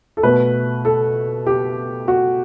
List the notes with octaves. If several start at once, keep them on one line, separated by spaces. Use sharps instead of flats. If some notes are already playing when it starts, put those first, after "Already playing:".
A4
B2 A3 B4
A4
G4
F#4